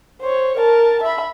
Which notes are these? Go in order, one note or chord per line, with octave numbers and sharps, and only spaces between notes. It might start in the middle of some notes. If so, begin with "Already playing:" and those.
C5 C#5
A#4 A5
E5 B5